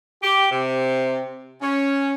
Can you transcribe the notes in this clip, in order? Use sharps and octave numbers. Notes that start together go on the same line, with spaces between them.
G4
C3
C#4